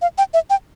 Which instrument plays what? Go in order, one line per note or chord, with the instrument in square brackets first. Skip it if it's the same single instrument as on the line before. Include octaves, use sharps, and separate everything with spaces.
[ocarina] F5
G5
E5
G5